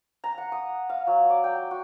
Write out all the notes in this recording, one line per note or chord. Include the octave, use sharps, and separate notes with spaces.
A#5
F#5
D#6
F5
F#3
D5
G5
F#4